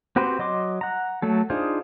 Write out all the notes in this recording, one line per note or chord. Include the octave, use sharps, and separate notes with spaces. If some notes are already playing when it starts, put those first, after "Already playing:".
C4 F#4 G4 B4 C5
F#3 D#5 C6 D6
F#5 A#5
F#3 A3 A4
D4 D#4 F4 G#4 C5